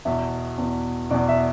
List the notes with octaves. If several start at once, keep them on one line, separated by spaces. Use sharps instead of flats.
E2 B2 E5
E2 B2
E2 B2 D5
E5